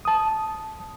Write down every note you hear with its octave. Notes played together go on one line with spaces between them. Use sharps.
A5 D#6